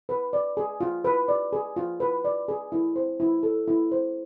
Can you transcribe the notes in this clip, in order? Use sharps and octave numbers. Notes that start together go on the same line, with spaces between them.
B4
D5
G#4
F4
B4
D5
G#4
F4
B4
D5
G#4
E4
C5
E4
A4
E4
C5